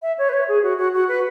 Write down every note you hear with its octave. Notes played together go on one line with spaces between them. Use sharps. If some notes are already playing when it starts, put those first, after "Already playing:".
E5
C#5
B4
C#5
G#4
F#4
F#4
F#4
B4